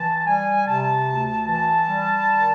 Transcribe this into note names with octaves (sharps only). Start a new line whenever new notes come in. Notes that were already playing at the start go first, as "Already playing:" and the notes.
Already playing: E3 A5
G3 G#5
C3 A5
D2
E3 A5
G3
D#3